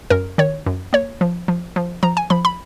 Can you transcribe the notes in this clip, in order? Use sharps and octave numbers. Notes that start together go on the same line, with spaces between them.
F#2 A#4
D#3 C#5
F#2
A#3 C#5
F3
F3
F3
F3 A#5
G#5
F3 B5
B5